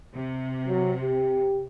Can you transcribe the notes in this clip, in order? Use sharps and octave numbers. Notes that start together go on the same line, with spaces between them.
C3
F#3
G4